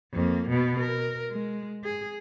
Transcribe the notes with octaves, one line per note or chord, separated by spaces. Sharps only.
F2 A#3
B2 B3
A#4
G#3
G#4